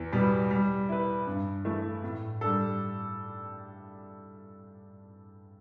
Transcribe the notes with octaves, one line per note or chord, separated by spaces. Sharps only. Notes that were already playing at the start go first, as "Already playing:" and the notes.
Already playing: E2
B2 G3 B3
G3
E4 B4
G2
E3 A3 E4
A2
G3 D4 A4